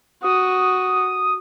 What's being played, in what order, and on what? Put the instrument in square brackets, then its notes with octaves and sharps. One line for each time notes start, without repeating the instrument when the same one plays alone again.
[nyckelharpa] F#4 [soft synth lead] D#6